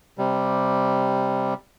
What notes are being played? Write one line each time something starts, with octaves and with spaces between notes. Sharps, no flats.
C3 G3